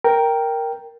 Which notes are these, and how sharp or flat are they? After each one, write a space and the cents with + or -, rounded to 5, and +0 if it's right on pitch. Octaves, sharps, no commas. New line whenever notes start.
A#4 +0 G5 +0